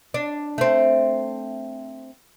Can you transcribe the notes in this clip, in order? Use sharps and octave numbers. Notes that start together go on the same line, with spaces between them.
D4
A3 C4